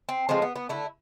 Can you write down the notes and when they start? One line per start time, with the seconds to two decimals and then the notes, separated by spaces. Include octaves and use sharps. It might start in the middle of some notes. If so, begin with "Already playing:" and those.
0.09 C4
0.29 A2 F3 G#3 C4
0.42 B3
0.56 B3
0.69 D3 A3 E4